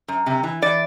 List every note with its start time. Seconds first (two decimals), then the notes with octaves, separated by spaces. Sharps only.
0.08 F#2
0.26 C3
0.43 E3
0.62 E3 D5